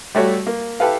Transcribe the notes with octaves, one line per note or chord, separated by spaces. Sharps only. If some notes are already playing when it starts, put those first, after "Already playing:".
G3 A3 F#4 C#5
A#3
E4 G4 A4 B4 F5